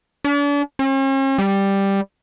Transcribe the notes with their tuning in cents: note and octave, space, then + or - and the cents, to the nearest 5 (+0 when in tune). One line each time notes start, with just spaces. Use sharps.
D4 -40
C#4 -45
G3 +5